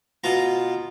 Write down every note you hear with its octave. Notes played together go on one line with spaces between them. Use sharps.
B2 F4 A#5